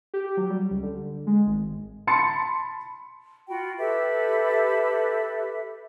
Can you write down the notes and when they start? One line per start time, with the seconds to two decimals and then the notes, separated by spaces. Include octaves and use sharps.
0.14 G4
0.37 F#3
0.50 G3
0.71 C#2
0.82 D3
1.27 G#3
1.46 G#1
2.07 A5 B5 C6 A6 C#7
3.48 F4 F#4 G5 B5
3.79 G4 A4 B4 E5